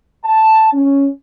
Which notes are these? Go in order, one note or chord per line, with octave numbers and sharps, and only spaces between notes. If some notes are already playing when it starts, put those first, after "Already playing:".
A5
C#4